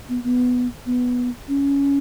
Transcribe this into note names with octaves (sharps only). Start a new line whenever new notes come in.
B3
B3
B3
C#4